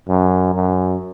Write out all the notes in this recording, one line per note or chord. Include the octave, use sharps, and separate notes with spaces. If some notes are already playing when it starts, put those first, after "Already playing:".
F#2
F#2